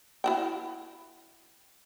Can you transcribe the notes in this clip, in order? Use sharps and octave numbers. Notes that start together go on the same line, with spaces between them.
E4 F#4 G5